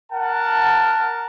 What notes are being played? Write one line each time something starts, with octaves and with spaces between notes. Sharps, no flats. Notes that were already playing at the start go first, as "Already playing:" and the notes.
A#4 F#5 A5